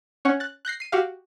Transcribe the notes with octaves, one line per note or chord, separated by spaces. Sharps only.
C#4 C#5 F#5
F#6 A6
F#6 G6 A#6 C7
C7 D#7
F#4 G4 F5